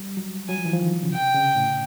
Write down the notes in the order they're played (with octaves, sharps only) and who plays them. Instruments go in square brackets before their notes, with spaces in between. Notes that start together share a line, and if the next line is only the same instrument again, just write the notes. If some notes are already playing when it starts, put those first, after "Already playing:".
Already playing: [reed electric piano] G3
F#3
[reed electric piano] F#3 [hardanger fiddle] G#5
[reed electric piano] F3
E3
F3
D#3
C#3
[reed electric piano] C3 [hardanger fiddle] G5
[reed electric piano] C#3
A2